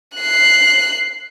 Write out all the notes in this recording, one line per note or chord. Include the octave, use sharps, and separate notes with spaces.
F#6 C7